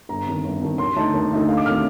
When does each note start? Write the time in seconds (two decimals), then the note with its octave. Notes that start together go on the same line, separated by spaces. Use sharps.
0.09 G1 A#5
0.26 F2 D#3
0.44 G1
0.61 F2 D#3
0.78 D#2 C6
0.96 D3 A3 D#4 A5
1.14 D#2
1.31 D3 A3 D#4
1.48 D2 F5
1.57 D6
1.66 C3 D#3 A3 F6